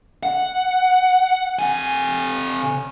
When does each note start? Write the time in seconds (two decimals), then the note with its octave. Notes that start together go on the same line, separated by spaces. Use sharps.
0.23 F#5
1.59 C3 G#5